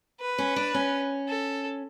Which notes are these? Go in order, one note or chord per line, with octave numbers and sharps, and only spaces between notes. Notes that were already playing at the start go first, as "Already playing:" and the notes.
B4
C#4
D4
C#4
A4